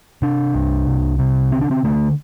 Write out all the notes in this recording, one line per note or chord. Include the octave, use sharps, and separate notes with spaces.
C3 D4
C2
C2
C3
D3 C4
D4
C4
D3 A3